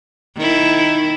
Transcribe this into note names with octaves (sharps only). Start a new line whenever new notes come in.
D#3 E4